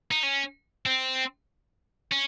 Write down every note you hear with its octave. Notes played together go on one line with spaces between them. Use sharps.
D#4
C#4
C4
C#4